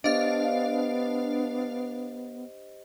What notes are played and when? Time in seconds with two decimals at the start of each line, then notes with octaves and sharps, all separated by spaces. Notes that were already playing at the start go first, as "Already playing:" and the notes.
0.04 B3 D4 G4 C5 D#5 F5